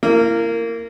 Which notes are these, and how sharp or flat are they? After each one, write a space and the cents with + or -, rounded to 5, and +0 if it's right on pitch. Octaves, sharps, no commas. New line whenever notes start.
A#3 -20 E4 +25